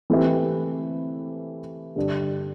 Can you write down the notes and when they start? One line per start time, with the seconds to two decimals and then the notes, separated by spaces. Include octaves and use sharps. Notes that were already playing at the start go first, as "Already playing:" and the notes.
0.10 E3 A3 C4 E4 G4
1.96 G2 D3 G3 D4